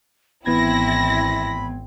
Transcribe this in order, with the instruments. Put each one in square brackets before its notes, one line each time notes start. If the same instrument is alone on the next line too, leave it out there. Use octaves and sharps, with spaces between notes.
[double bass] G#1 C4 [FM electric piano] E3 B3 G#6 [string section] E4 A#6 [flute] B5